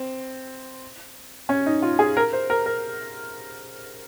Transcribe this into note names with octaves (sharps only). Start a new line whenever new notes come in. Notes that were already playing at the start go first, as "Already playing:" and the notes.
Already playing: C4
C#4
D#4
F4
G#4
A#4
C5
A#4
A#4